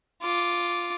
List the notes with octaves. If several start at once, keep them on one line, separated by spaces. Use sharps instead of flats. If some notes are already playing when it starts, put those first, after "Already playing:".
F4 D6